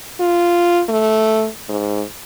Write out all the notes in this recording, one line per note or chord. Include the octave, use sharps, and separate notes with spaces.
F4
A3
G#2